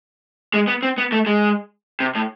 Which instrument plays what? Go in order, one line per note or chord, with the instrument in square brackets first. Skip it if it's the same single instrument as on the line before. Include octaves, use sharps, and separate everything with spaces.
[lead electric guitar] G#3
B3
C4
B3
A3
G#3
C3
A2